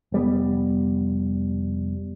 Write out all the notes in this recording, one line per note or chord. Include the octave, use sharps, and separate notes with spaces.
F1 G3 B3